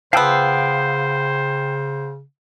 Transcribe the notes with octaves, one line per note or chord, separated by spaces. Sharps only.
C#3 F3 B3 C5 F5 G5 E6